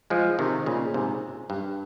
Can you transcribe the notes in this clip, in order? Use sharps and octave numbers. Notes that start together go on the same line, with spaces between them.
F3 G#3
C3 D#3
A#2 C#3
G#2 C3
G2